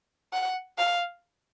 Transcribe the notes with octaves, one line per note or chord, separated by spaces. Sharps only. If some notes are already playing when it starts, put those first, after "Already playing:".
F#5
F5